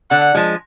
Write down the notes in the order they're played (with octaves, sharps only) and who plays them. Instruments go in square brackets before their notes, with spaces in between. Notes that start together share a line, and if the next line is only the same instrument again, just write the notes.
[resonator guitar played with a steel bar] D3 [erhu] F#5
[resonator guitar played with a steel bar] F3 G#3